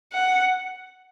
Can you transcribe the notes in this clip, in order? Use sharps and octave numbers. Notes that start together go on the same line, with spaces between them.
F#5